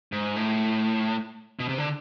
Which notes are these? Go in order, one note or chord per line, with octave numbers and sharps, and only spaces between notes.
G#2
A2
B2
C3
D3